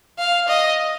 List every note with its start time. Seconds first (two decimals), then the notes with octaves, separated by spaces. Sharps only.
0.19 F5
0.48 D#5